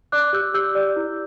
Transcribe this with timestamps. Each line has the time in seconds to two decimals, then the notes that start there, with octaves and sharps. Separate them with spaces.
0.12 D5 D6 F#6
0.33 G4 E6 G6
0.54 G4 E6 G6
0.75 D5
0.96 E4